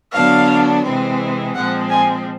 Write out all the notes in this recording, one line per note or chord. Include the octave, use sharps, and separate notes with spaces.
D3 F#3 B3 D4 F5
C3 E3 G#3 C4
A#2 F3 G#3 C4 F#5
G#5